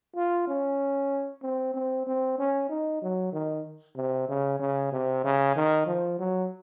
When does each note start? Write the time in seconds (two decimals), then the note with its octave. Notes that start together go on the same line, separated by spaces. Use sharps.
0.16 F4
0.47 C#4
1.42 C4
1.74 C4
2.07 C4
2.38 C#4
2.69 D#4
3.02 F#3
3.32 D#3
3.96 C3
4.29 C#3
4.59 C#3
4.92 C3
5.24 C#3
5.56 D#3
5.86 F3
6.19 F#3